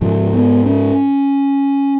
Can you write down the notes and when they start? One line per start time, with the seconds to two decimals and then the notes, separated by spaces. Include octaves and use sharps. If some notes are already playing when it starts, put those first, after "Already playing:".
0.01 G#2 F3
0.34 B3
0.66 C#4